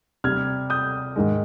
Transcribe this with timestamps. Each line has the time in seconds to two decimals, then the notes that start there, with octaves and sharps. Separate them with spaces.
0.24 C3 G3 F6 G#6
0.70 D#6 G6
1.16 G#2 D#3 G#3